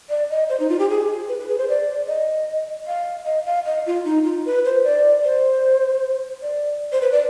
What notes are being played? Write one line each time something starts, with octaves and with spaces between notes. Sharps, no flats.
D5
D#5
C5
D#4
F4
G4
G#4
B4
B4
G#4
C5
D5
D#5
F5
D#5
F5
D#5
F4
D#4
F4
B4
C5
D5
C5
D5
C5
B4
D5